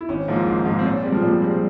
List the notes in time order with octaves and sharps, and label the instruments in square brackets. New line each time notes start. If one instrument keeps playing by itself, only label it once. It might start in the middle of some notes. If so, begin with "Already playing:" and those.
[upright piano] E4
[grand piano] G#1 [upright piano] C#4
[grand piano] G#2 F3 A#3
G#1
G#2 F3 A#3
[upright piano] C4
[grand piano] A#2 [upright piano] C#4
[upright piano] G3 [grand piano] G#3 C4
[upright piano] F3
[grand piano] A#2 [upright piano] G3
[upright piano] F3
[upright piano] G3 [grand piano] G#3 C4